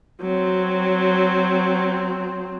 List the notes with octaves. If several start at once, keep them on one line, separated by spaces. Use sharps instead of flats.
F#3 C4